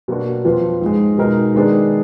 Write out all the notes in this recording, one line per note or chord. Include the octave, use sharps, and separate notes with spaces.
B2 F#3 A#3 D4 F#4
F2 F3 B3 F4 B4
G#2 F3 G#3
B2 G#3 D#4 A#4
D#3 G#3 B3 D4 G#4